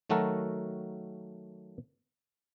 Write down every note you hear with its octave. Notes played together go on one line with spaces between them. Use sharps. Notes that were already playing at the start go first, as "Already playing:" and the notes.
D#3 F#3 A3 F#4 A4 A#4